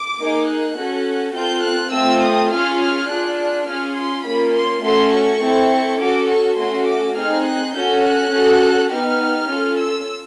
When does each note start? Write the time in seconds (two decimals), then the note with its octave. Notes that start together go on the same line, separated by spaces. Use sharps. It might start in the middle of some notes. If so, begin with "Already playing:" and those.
Already playing: D6
0.19 A#3 D#4 G#4
0.48 F#6
0.77 C#4 F#4 A4
1.35 C4 F4 A4 G6
1.64 F#6
1.94 A3 C4 F4 E6
2.23 D#6
2.51 C#4 F4 G#4 F6
2.81 F6
3.10 D4 F4 G#4 F#6
3.39 F#6
3.67 C#4 F4 G#4 F6
3.97 C6
4.25 A#3 C#4 F4 B5
4.55 C6
4.84 A3 C#4 F#4 A4 C6
5.14 C#6
5.42 C4 E4 A4
6.00 C#4 F#4 A4 D6
6.30 C#6
6.58 A3 C#4 F#4 A4 C6
6.88 D6
7.16 C4 D#4 G#4 F6
7.46 F#6
7.75 C#4 F#4 A4 G6
8.04 F#6
8.32 C#4 F#4 A4
8.91 B3 D#4 G4 F6
9.49 C#4 F4 A4
9.79 E6